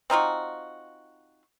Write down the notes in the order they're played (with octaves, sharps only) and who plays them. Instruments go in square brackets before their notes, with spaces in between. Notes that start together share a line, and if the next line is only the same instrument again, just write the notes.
[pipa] C4 D#4 F4 F#4